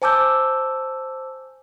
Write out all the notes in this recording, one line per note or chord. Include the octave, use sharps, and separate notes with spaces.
C5 G#5 A5 D6 E6 G6